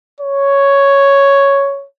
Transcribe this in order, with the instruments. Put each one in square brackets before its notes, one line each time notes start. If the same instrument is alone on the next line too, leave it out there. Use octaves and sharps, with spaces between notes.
[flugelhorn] C#5